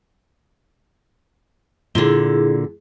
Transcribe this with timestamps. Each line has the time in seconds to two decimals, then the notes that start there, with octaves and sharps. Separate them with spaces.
1.95 A#2 D3 E4 G#4